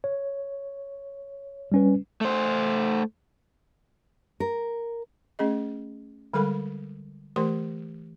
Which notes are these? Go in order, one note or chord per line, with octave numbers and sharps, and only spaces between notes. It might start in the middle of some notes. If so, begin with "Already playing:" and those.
C#5
G3 C#4 B4
A3 C5
A#4
A3 C#4 G#4 D#5
D3 G3 G#3 A4 A#4 B5
E3 A3 G4 A#4 C5 C6